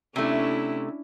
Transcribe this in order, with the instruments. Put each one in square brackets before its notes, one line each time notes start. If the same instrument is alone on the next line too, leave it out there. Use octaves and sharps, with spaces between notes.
[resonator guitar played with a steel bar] C3 A3 [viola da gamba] C#4 D4 E4